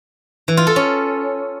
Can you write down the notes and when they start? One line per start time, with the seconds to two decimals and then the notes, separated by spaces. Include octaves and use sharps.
0.48 E3
0.57 F4
0.67 A4
0.76 C#4